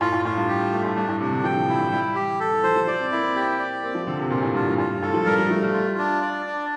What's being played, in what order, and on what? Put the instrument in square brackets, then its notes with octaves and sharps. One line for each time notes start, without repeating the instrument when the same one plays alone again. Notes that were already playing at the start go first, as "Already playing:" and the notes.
[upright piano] A2 [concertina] F4
[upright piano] A2
[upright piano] A2 [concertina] F4
[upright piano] G2
[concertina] G4
[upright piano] G2 [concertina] A3
[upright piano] A2
[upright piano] G2 [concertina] D4
[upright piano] A2
[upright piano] C3 [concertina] D4
[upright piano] D3
[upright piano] F3 [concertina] G5
[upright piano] E3
[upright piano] D3 [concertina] E4
[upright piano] A2
[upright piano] G3 [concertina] E4
[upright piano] E3 [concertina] G4
[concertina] A4
[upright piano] E3
[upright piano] F3 [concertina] C5
[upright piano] F3
[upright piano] F3 [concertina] D5
[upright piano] C4
[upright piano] A#3 [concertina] E4
[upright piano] C4
[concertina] G4
D5
[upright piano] A#3 [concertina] C4
[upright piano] F3
[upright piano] D3 [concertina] C4
[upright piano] C3
[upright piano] A#2 [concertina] F4
[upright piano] A2
[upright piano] G2 [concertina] F4
[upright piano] A2
[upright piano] A2 [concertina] F4
[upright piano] G2
[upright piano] A2 [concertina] A4
[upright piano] F3
[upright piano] G3 [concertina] A#4
[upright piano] F3
[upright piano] F3 [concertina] A3
[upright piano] G3
[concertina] F4
D4
D5
D4